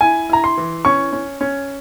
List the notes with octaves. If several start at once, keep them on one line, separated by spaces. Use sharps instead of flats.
E4 G#5
E4 A#5
C6
E3
C#4 C#6
C#4
C#4